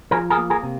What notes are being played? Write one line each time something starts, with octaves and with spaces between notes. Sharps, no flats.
F3 G#4 A#4
G#4 A#4
A#3
G#4 A#4
C3